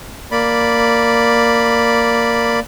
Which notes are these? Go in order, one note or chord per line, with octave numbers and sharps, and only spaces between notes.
A#3 D5 B5